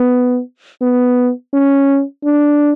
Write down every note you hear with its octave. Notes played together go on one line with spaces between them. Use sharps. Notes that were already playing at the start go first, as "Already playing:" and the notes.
Already playing: B3
B3
C#4
D4